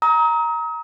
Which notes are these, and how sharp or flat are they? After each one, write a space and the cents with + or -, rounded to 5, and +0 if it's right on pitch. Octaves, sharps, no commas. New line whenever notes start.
A#5 +5 D#6 +40